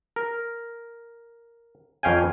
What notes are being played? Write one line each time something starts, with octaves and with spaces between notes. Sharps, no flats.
A#4
F2 C#4 F5 G5 G#5